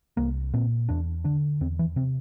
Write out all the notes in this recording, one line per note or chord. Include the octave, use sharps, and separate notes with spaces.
C2 A#3
A#2 C4
E2 D4
D3 D4
E2 C4
E3
C3 C4